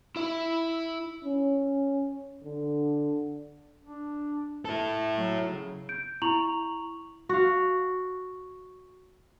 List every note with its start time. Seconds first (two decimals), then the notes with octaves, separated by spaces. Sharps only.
0.16 E4 E5
1.25 C#4
2.44 D3
3.84 D4
4.65 A3 E4 A4
5.17 F#3
5.50 C#3
5.89 G6 D7
6.22 E4 A#5 C#6 F7 F#7
7.29 F#4 F5